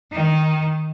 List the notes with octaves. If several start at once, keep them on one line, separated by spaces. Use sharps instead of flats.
D#3